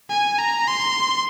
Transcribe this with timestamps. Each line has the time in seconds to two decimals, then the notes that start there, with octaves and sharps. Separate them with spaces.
0.10 G#5
0.38 A#5
0.67 C6